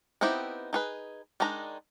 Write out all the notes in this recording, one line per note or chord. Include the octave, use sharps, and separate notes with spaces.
B3 C4 D#4 E4 G4
D#4 G#4 B4
D#3 G#3 D4 D#4 A#5